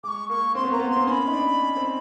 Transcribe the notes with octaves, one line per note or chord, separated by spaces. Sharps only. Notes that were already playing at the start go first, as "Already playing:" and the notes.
G#3 D6
C#6
A#3 C#6
C4 C6
B3
A#3 A#5
B3
C6
C4
C#4 C6
B5
D#4
D4
C#4
C4